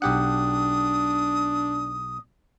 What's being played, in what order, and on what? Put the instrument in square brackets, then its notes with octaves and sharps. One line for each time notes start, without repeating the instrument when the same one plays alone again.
[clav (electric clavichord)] B1 G4 F#5 [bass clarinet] D4 [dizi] D#6